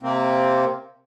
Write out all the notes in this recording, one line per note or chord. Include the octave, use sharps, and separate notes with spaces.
C3 A#3 C4